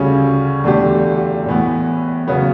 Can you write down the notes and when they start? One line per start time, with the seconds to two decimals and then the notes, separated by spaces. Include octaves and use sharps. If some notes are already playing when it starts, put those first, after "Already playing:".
Already playing: D2 C#3 G3 C#4
0.64 E2 D3 A3 D4 G4
1.46 A2 E3 B3
2.28 C#3 F#3 B3